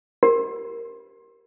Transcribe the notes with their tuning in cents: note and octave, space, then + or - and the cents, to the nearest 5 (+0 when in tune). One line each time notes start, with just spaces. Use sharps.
G4 -25 A#4 +0